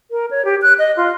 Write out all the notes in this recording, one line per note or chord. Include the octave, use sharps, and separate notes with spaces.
A#4
C#5
G4
F#6
D#5
F4